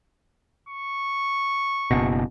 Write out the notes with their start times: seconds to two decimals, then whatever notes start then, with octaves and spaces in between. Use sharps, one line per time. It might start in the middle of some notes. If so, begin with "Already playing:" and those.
0.69 C#6
1.91 F#1 B2